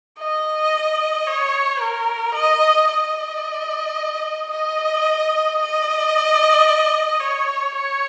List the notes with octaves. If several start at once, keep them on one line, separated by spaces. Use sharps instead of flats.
D#5
C#5
A#4
D#5
D#5
D#5
D#5
C#5
C#5